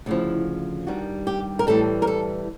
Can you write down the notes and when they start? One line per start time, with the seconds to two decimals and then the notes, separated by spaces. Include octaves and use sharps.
0.06 D2 C#3 F3 E4
0.87 G2 D#3 G3 F#4
1.27 G4
1.59 A#4
1.67 A2 E3 G3 A4
2.02 A#4
2.07 A4